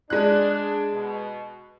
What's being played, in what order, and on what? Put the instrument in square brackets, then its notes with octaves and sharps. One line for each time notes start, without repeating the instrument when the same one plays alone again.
[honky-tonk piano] G#3 F#6 [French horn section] D4
[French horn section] B2